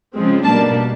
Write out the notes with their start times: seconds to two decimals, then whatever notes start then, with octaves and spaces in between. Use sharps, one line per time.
0.15 C#3 F3 G#3 C4
0.45 B2 G3 A#3 D4 A5